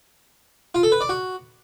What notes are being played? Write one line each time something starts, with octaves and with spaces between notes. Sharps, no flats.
F4
A4
B4
D5
F#4